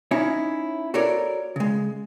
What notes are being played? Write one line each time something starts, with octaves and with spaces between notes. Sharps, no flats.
C#4 D#4 E4 C#5
F#4 A4 A#4 C#5 D5
C#3 G#3